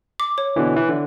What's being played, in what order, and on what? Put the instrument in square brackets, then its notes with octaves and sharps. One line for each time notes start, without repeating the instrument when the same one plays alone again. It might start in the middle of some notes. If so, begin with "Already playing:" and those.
[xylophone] D6
C#5
[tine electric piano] B2 D3 E3
E3
D3